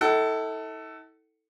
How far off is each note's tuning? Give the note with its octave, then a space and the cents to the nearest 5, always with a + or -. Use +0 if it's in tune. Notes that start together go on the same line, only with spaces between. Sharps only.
E4 -45 A4 +10 F#5 +40